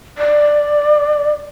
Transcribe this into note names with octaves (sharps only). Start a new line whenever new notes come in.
D5